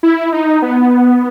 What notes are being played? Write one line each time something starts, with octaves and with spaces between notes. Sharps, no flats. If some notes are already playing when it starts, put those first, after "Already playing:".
E4
D#4
B3